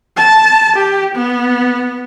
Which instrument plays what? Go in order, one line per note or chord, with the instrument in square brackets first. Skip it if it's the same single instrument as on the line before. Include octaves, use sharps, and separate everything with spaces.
[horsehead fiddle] A5
G4
B3